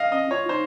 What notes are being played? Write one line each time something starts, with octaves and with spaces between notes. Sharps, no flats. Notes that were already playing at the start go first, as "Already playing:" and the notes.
Already playing: D#5 F5
C#4 D#5
F4 C#5
D#4 C5